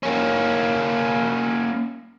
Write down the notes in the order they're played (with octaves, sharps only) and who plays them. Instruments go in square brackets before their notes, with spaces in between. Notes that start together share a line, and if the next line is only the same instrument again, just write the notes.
[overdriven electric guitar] A#3 C#4